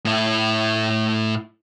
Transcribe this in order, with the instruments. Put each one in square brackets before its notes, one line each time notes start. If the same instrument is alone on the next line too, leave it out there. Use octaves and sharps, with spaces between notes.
[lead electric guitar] A2 E4